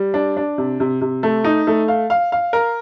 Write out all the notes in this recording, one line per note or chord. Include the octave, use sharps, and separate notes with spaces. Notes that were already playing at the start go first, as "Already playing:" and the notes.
Already playing: G3
D4
D4
C3
C3
C3
A3
D#4
A3
F5
F5
F5
A#4